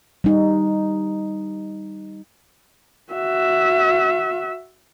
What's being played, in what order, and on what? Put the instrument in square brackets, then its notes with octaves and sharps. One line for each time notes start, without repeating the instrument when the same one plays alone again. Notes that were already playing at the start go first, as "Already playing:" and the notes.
[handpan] G3 D#4
[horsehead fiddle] F#4 E5